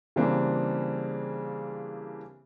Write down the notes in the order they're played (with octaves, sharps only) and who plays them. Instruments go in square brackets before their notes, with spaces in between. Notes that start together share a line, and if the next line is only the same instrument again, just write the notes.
[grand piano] C#3 E3 G3 A#3 C4 D4